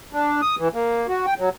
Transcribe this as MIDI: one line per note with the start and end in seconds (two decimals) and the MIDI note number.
0.13 0.41 62
0.41 0.56 87
0.58 0.68 52
0.74 1.07 58
1.08 1.26 66
1.26 1.34 79
1.39 1.49 54